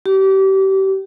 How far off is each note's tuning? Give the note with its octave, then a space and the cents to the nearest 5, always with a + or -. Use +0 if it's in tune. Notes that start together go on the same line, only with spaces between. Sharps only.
G4 -30